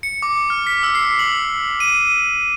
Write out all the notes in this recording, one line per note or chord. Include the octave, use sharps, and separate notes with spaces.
C#7
D6
F6
B6
E6
C7
F#7
D#7